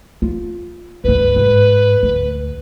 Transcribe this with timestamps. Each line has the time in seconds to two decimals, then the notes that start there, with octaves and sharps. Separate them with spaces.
0.22 F4
1.04 C#2 G2 B4
1.36 G#2
2.03 D2